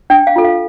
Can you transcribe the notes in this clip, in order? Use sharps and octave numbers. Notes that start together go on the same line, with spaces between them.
D4 G5
F5
F4 A4
F5